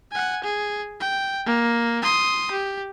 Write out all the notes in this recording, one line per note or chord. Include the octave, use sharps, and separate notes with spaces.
F#5 G#5
G#4
G5
A#3
C6 D#6
G4